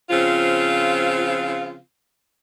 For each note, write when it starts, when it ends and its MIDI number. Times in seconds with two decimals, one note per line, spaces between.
0.10 1.78 49
0.10 1.78 53
0.10 1.78 60
0.10 1.78 65